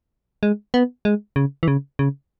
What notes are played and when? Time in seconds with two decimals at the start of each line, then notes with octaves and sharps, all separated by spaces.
0.43 G#3
0.74 B3
1.05 G#3
1.36 C#3
1.63 E3
1.68 C#3
1.99 C#3